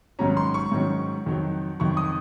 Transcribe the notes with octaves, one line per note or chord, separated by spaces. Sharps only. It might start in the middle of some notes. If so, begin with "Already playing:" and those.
G#2 D#3 F#3 C#4 A#5
C6
C#6
G#2 D#3 F#3 C#4
F2 D#3 F#3
F2 D#3 F#3 C#6
D#6